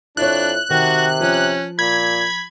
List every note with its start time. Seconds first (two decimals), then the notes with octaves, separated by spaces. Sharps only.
0.17 F2 D4 E4 C#5 F#6
0.70 C3 D#3 F#4
1.21 F3 C#4
1.79 A#2 B5 G#6